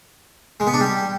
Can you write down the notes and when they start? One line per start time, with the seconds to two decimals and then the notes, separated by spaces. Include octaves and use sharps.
0.60 G#3
0.67 B3
0.74 D4
0.80 G3